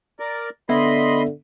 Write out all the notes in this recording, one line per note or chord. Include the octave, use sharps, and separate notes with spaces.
A#4 D5
D3 B3 D#5 E5 B5 C6